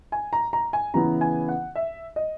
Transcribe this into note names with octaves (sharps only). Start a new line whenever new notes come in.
G#5
A#5
A#5
G#5
C#3 E3 B3 E4 A#5
G#5
F#5
E5
D#5